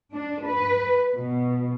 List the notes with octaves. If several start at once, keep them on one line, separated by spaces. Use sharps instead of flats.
D4
B4
B2